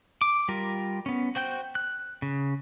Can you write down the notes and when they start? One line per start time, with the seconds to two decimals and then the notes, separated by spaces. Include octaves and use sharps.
0.21 D6
0.48 G3 F4 A#4
1.06 B3 C#4
1.35 F#4 C5 G5 G6
1.75 F#6
2.22 C#3